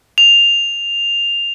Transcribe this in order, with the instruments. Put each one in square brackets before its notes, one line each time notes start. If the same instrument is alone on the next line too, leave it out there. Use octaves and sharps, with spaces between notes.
[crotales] F7